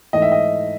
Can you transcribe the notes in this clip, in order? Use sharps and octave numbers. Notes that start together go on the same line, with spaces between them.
G#2 E3 A3 D#5
E5
D#5